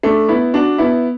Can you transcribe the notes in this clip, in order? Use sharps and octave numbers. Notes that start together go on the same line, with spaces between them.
A3 D4
B3 E4
D4 F#4
B3 E4